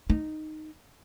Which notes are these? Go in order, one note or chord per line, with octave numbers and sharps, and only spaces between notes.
D#4